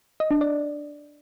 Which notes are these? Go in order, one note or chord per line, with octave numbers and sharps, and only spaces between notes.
D#5
D4
D5